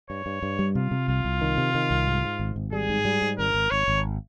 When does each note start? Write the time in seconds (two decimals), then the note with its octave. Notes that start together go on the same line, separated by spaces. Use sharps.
0.10 G2 C#5
0.26 G2
0.43 G2
0.59 G3
0.75 C3 F4
0.91 C3
1.08 C2 F4
1.25 C2
1.41 D#3
1.57 C3
1.75 D#3
1.91 C2
2.07 G#2
2.24 G#2
2.39 G#1
2.56 G#1
2.72 G3 G#4
2.89 G#2
3.05 G3
3.22 G#2
3.39 G#1 A#4
3.55 G#1
3.71 G#1 C#5
3.88 G#1